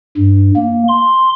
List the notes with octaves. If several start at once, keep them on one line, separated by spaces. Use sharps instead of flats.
G2
A#3
C6